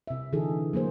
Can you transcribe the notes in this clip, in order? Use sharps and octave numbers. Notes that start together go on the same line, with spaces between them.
C3 E5
D3 E3 D#4 G#4 A4
F#3 A#3 G#4 C5